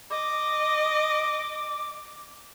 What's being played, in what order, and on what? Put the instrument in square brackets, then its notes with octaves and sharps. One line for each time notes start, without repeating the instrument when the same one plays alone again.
[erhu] D#5 [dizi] D6